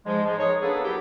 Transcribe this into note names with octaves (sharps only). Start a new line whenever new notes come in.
G#2 F3 G#3
G#2 F3 G#3
D#3 D#4 G#4 C#5
A#3 B3 D4 G#4 A4 B4
F#3 E4 G4